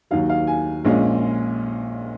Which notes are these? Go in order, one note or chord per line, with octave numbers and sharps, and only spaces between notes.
D#2 D#3 F#3 F5
F5
G#5
A#1 A#2 G#3 C#4 F4